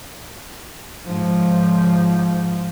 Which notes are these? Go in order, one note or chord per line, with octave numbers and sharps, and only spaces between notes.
G#2 F3